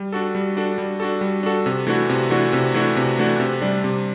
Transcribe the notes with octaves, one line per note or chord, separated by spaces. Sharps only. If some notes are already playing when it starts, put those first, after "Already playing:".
Already playing: G3
D4 F#4 A4
G3
D4 F#4 A4
G3
D4 F#4 A4
G3
D4 F#4 A4
C3
E3 A3 D4 F#4
C3
E3 A3 D4 F#4
C3
E3 A3 D4 F#4
C3
E3 A3 D4 F#4
C3
G3 D4
C3